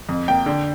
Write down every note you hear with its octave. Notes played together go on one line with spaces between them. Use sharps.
F2
A#3 G5
D3